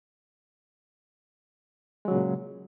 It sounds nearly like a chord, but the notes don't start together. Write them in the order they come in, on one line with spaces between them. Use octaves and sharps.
G#3 F#3 C#3 A#2